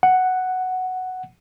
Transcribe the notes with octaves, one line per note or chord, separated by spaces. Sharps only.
F#5